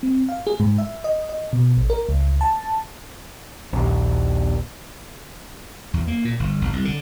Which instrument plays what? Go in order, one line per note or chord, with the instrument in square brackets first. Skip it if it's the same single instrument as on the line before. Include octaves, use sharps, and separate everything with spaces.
[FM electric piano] C4
F5
G#4
G#2
E5
D#5
D#5
B2
A1
A#4
C#2
A5
[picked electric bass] A#1 D#2
[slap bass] E2
A#3
A#2
G1
G1
C2
D3